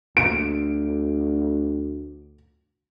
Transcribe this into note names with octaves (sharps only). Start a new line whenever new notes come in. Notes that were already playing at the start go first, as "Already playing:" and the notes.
D2 D7